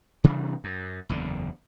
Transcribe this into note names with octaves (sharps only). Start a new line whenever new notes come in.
C3 E3 G3 D4
F#2
F#1 E2 D3